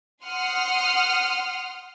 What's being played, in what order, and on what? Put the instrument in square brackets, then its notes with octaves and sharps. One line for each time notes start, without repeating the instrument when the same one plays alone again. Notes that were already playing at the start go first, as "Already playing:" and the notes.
[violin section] F#5 C6 D#6 F6